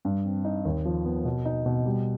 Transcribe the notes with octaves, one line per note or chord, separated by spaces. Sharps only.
G2
C4
D#4
D#2
F3
B3
B2
D#4
B2
G3